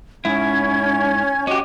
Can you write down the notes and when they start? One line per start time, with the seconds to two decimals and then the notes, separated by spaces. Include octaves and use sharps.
0.25 G#2 C#4 E4 G#6
1.47 C#4 F#4 G4 D#5 D6